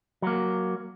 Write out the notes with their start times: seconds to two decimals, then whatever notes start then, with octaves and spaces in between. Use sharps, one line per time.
0.22 F#3 A#3